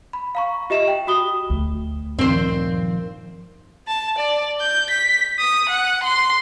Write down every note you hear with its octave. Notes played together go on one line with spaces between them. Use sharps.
B5
F5 A#5 C#6
F4 G4 D#5 E5 A#5 E7
G5
F#4 B5 D#6 G7
D2
G2 A#2 D#3 F3 C4 C5
A5
D5
G6
B6
D#6
F#5
C6